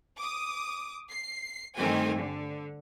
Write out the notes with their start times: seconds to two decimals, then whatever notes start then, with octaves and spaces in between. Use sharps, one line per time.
0.18 D6 D#6
1.11 C7
1.77 G2 D#3 A3 C4 G4 G#5
2.15 D3